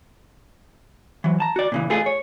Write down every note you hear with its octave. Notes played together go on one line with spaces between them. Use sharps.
E3 F#3
A5 A#5
F#4 D5
A#2 C#3 E3
A3 F4 G#4
C#5